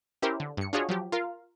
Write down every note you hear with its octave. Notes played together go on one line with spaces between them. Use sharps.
C#4 E4 G4 A#4 C5
D3
G2 C#7
D4 F4 F#4 G#4 C#5 D#5
F3 F#3 G4
F4 A#4 F5